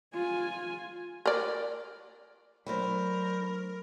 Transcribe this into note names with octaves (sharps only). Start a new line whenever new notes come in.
F4 G#5
A#4 D5
F#3 A3 D4 A#4 C5 B5